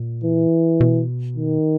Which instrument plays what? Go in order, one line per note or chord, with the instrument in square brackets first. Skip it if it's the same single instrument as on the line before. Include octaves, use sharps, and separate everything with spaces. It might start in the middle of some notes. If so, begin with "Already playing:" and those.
Already playing: [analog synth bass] A#2
[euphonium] E3
[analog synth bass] B2
[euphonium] D#3